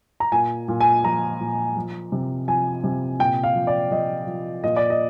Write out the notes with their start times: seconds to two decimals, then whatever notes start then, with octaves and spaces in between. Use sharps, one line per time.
0.20 A#5
0.32 A#2 G#5
0.68 A#2
0.81 G#5
1.04 F3 A#5
1.40 A#2
1.76 F3
2.12 C3
2.48 F3 G#5
2.84 C3
3.19 A#2 G5
3.44 F5
3.55 F3
3.67 D5
3.91 F3 D#5
4.27 F3
4.64 A#2 D#5
4.76 D5
4.90 D#5